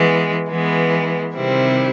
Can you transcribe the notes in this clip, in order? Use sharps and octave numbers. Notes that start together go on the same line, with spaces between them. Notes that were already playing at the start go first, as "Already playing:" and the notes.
Already playing: E3 G#3 B3
E3 G#3 B3
C3 D#3 G3 C4 E4